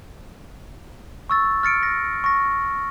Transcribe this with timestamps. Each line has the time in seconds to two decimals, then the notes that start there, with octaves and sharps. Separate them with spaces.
1.30 C#6 E6 A6
1.63 F6 A6 C#7 D7
1.83 A#6
2.24 C#6 A#6